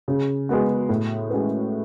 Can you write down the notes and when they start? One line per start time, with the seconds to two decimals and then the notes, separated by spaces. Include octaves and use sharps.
0.08 C#3
0.49 G#3 B3 F#4
0.89 A2
1.30 G#3 C#4 F#4 B4